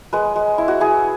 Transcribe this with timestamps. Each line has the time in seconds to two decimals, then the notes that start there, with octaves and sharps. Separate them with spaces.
0.13 G#3 B4
0.36 G#3
0.58 E4
0.68 F#4
0.80 E4 G#4